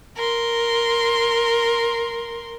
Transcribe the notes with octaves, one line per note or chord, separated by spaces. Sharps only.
A#4 C6